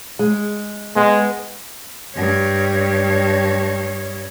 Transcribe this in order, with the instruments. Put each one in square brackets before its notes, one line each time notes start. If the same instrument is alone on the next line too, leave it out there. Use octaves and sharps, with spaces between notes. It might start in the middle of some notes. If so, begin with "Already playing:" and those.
[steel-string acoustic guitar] G#3
[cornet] G#3 [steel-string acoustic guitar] B3
[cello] G2 C#5